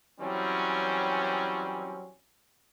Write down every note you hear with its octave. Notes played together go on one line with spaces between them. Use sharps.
E3 F#3 G3 C4 C#4